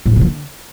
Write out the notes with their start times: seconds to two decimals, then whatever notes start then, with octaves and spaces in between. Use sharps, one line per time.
0.06 A2
0.11 F#3
0.16 C3
0.21 F3
0.26 D3